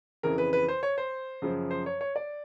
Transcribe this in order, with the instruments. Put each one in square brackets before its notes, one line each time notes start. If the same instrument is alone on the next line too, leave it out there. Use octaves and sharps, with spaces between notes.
[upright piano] F2 C#3 E3 A#4
B4
B4
C5
C#5
C5
F#2 C#3 F3
C5
C#5
C#5
D5